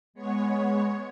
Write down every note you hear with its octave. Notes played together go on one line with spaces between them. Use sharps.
G#3 B3 C#5